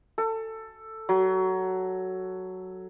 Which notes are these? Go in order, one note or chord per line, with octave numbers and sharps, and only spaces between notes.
A4
F#3